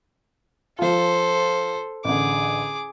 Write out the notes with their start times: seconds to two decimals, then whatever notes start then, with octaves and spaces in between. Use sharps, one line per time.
0.79 F3 F4 A4 C5
2.05 A1 D3 G#4 D6